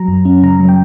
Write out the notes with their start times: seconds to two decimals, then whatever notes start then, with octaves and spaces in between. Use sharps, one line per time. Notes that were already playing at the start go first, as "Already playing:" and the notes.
Already playing: F#3 A#5
0.08 F#2
0.25 C#4
0.43 C#3 A#5
0.60 F#3
0.69 G5